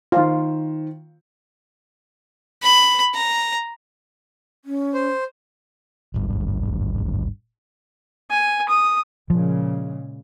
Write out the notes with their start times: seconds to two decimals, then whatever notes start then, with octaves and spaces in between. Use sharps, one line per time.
0.12 D#3 F4 C5
2.63 B5
3.14 A#5
4.65 C#4
4.94 C5
6.14 D1 G#1 G2
8.30 G#5
8.69 D#6
9.30 A#2 C#3 F3 G#3